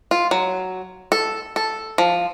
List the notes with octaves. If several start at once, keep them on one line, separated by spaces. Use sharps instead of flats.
F4
F#3
A4
A4
F3